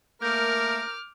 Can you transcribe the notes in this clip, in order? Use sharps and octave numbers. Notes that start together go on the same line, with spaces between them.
A3 A#3 A#4 D6 F6 G6